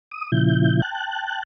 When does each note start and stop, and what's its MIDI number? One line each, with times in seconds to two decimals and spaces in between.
0.11 0.31 87
0.32 0.81 46
0.32 0.81 49
0.32 0.81 53
0.32 0.81 64
0.32 0.81 91
0.82 1.43 79
0.82 1.43 81
0.82 1.43 90